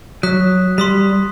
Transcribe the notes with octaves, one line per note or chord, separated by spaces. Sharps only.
F#3 D#6 F#6 B6
G3 C6 D#6 B6